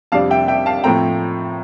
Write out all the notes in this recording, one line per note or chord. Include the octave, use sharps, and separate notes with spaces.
F2 C3 G3 D4 F5 A5
E5 G5
E5 G5
F5 A5
A2 F3 A3 C4 G5 A#5